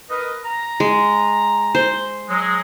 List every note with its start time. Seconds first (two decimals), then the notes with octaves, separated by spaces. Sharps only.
0.10 A#4 B4 D#5
0.44 A#5
0.80 G#3
1.75 C5
2.29 F#3 G#3